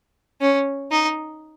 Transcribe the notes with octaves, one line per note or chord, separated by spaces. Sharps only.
C#4
D#4